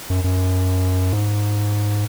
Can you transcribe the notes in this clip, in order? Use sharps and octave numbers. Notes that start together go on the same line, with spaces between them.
F#2
F#2
G#2